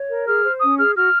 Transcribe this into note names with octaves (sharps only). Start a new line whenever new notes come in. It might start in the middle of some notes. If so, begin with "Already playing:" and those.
Already playing: C#5
A#4
G#4 F6
C5
C#4 D#6
G#4 F6
F#4 F6